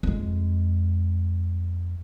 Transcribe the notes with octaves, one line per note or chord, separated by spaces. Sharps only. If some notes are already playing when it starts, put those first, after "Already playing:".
F2 G#3